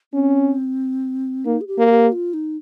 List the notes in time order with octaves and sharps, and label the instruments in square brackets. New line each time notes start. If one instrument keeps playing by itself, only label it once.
[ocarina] C4 [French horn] C#4
[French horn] A#3 [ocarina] D#4
[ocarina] G#4
G4
[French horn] A#3
[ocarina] G4
F4
D#4